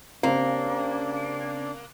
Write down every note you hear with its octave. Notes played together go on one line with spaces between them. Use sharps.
C#3 A#3 C4 D4 G4 C5